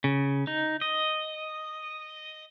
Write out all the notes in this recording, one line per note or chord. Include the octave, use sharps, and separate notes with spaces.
C#3
D#4
D#5